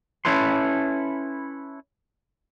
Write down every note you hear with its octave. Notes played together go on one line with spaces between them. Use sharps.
C#4 E4 A4 B4 C6